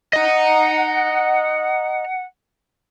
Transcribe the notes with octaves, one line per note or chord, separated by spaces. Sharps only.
D#5 F#5 A#5